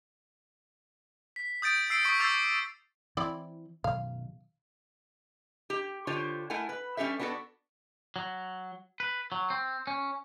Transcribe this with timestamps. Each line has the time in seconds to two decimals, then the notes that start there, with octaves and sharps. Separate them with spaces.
1.36 B6
1.62 D#6 G6 A6 D7
1.90 E6 C7 D7
2.05 C#6 D#6 B6 C7 D7
2.20 C#6 D6 E6 G6 A6 C7
3.17 E3 C4 E4 D5
3.84 B2 D#3 F#3 F5
5.70 G4
6.07 D3 F4 G4 C5 C#5 A5
6.50 A3 E4 A#4 F#5 G#5
6.69 B4
6.97 G3 C#4 G4 A4 E5
7.19 B3 D4 F#4 G#4 A4
8.16 F#3
9.00 B4
9.32 F#3
9.50 C4
9.87 C#4